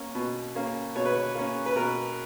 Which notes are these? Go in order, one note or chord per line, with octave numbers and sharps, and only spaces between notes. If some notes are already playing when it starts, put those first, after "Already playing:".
Already playing: A#3 C#4
B2
A#3 C#4
B2 C#5
B4
C#5
A#3 C#4
B4
B2 A#4